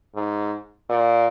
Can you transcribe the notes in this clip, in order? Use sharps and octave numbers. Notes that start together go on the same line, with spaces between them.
G#2
A#2